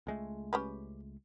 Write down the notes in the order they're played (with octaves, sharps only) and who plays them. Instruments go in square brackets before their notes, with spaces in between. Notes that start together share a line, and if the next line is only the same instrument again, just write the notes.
[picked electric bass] C#2 G#3 A3
[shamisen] C#4 G4 B4